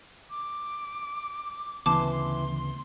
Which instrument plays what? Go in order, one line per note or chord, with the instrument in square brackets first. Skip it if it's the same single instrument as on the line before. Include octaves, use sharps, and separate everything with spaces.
[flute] D6
[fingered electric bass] D2 C#3 B3 [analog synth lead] E3 [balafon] A5 D6 [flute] C6
[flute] C6